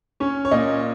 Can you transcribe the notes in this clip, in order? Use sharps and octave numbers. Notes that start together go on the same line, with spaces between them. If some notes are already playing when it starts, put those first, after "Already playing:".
C#4 C#5
C#5
A#2 D#5